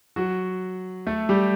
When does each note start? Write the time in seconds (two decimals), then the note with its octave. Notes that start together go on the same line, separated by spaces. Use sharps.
0.16 F#3 F#4
1.07 A3 A4
1.29 G3 G4